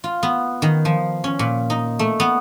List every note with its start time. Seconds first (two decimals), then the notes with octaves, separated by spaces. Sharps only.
0.04 F4
0.23 B3
0.62 D#3
0.85 F3
1.24 C#4
1.39 A#2
1.70 D#4
1.99 A3
2.20 B3